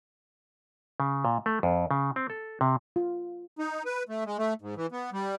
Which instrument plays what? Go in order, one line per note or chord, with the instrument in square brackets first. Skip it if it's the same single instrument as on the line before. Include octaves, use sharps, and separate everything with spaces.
[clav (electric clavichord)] C#3
A#2
A3
F2
C#3
C4
A4
C3
[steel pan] F4
[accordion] D#4
B4
A3
G#3
A3
G#2
E3
B3
G3